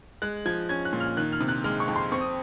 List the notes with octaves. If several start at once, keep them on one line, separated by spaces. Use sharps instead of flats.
G#3 F#6
F3 G#6
C#4 G#6
F#6
A#2
F6
D#3 F#6
F6
C3
F#6
G#3 F6
C#6
F2
C6
C4 C#6
D#6